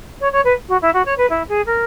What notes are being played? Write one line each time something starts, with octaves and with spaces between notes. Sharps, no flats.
C#5
C#5
B4
F#4
E4
F#4
C#5
B4
E4
G#4
A#4